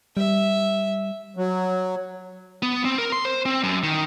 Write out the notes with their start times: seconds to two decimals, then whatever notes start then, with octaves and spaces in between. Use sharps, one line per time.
0.17 G3 E5
1.36 F#3
2.62 B3
2.85 C4
2.98 A#4
3.12 C6
3.25 C5
3.45 C4
3.63 F#2
3.83 D#3